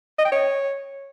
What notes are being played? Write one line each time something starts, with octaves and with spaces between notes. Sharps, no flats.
D#5
G5
C#5